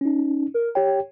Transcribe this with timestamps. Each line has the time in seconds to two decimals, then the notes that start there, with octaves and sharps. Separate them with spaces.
0.01 C#4 D#4
0.54 A#4
0.75 G4 C#5 G5